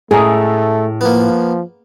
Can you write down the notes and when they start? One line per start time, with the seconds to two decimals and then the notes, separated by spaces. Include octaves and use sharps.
0.11 A2 A3 G#4 A#4
1.01 F3 A#3 B3